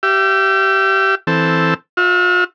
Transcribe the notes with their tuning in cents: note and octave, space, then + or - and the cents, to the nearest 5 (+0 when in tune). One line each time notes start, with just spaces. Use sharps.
G4 -20 E5 +40
E3 +0 C4 +0 A4 +0
F4 +45 E5 +0